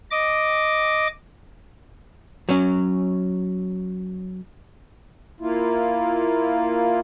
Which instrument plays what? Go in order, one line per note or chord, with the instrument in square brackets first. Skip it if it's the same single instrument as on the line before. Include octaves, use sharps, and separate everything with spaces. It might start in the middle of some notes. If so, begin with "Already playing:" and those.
[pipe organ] D#5 D6
[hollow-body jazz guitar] F#3 C#4
[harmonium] A#3 E4 F4